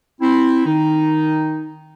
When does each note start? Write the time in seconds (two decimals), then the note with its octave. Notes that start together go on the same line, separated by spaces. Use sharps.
0.21 C4 E4
0.66 D#3 D#4